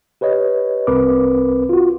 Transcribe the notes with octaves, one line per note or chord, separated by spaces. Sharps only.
G4 B4 C#5 D#5
C2 C4 A#4 B4 D6
F4 F#4